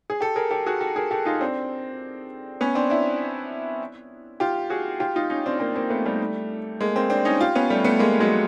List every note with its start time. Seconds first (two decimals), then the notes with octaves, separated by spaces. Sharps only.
0.10 G#4
0.21 G4 A4
0.36 G#4 A#4
0.51 G4 A4
0.66 F#4 G#4
0.81 G4 A4
0.96 G#4 A#4
1.11 G4 A4
1.25 D#4 F4
1.41 C4 D4
2.61 B3 C#4
2.75 C4 D4
2.90 D4 E4
4.40 F4 G4
4.70 F#4 G#4
5.00 F4 G4
5.16 D#4 F4
5.30 C#4 D#4
5.46 C4 D4
5.60 A#3 C4
5.76 A#3 C4
5.90 A3 B3
6.06 G3 A3
6.81 G#3 A#3
6.96 A#3 C4
7.10 C4 D4
7.25 C#4 D#4
7.40 F4 G4
7.55 B3 C#4
7.70 G3 A3
7.84 A3 B3
7.99 G#3 A#3
8.20 F#3 G#3